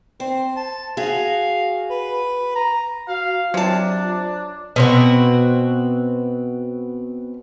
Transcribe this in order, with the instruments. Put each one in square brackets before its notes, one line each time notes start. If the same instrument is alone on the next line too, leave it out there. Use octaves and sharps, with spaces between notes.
[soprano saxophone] C4 [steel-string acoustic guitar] C5
[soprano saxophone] A5
[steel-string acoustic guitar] F#4 G#4 [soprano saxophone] F5
[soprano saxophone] B4
A#5
[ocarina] F#4 [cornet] F5
[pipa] C3 A5 [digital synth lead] F#3 [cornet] D4 [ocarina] F4
[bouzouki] B2 C4 F#4